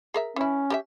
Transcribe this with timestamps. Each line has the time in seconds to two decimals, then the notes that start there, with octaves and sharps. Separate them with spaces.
0.14 G#4 A#4 E5
0.36 E3 C#4 E4
0.70 G4 A#4 E5